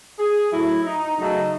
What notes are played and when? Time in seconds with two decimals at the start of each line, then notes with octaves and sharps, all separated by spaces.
0.20 G#4
0.51 A2 F#3 A3 E4
0.84 D#4
1.18 F#2 C#3 F#3 A3 D#4